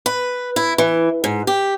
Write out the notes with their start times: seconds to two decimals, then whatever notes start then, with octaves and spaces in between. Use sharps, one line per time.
0.06 B4
0.56 E4
0.78 E3
1.24 G#2
1.47 G4